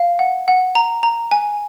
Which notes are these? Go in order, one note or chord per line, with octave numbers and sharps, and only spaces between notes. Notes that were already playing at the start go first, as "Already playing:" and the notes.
Already playing: F5
F#5
F#5
A#5
A#5
G#5